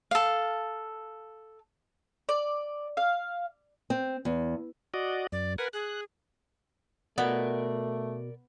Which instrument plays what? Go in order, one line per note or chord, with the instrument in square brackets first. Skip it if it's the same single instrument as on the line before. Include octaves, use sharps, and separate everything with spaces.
[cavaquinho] A4 F5
[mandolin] D5
F5
[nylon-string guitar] C4
E2
[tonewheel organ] F#4 D5 D#5
[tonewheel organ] F#2 [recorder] D5
[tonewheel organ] A#4 F#5 G#5 [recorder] B4
[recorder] G#4 [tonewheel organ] F#6
[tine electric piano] B2 [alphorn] A3 [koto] B3 [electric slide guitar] A#4 D5